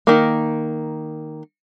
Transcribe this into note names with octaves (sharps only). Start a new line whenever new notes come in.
D#3 A#3